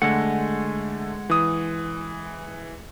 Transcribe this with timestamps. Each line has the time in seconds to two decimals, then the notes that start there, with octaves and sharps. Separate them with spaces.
0.02 D3 G#3 A3 F#5
1.30 E3 D#6